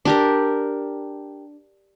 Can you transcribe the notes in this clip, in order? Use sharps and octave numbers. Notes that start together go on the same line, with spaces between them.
D4 G4 A#4